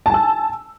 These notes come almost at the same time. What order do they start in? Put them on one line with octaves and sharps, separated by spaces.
A5 G#5 E6